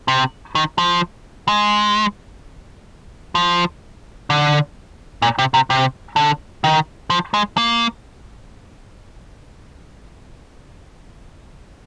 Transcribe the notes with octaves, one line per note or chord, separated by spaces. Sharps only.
C3
D#3
F3
G#3
F3
D3
A#2
C3
C3
C3
D3
D#3
F3
G#3
A#3